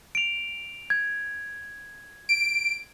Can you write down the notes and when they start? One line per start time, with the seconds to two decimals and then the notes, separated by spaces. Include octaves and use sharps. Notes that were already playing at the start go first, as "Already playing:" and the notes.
0.15 D7 F7
0.90 G#6
2.29 D7